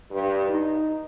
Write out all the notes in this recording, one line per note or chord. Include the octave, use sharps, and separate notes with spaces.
G2
D#4